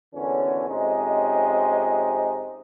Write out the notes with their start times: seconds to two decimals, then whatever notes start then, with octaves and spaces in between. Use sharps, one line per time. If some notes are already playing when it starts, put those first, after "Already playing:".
0.15 G#1 E2 D3 C#4
0.69 F2 C3 G#3 C#4 D#4